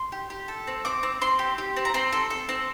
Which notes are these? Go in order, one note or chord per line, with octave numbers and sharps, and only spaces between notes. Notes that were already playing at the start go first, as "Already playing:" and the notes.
Already playing: C6
G4
G4
A4
C4
C4 D6
C4
C4 C6
G4
G4
C4
A#5
C4 C6
A4
A4
C4